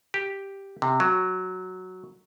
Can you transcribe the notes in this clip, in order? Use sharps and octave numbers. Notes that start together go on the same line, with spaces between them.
G4
C3
F#3